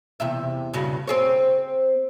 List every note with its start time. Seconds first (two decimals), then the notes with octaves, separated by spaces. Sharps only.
0.20 E2 C3 E5
0.74 G2 C#3 F#4
1.08 C4 G#4 C#5